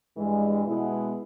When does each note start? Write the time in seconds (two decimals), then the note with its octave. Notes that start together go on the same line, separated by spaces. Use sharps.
0.16 G2 E3 G#3
0.65 B2 G#3 B3 E4